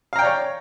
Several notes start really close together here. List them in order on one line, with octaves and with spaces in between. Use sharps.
F5 A#5 G5 D5 C#5